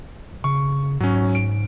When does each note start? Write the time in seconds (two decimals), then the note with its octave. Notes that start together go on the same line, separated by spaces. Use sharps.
0.44 C#3 C#6
1.00 G#2 F#3 C#4
1.35 D7